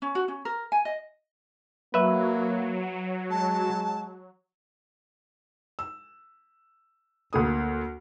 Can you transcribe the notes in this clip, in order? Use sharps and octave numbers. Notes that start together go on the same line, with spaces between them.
C#4
F#4
C#4
A#4
G#5
D#5
F#3 A#3 B4 E5
G#3 A5
E6
D2 A#3 D#6